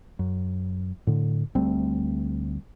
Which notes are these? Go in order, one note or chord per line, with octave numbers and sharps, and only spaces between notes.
F#2
A2 D3
D2 G3 A3 C4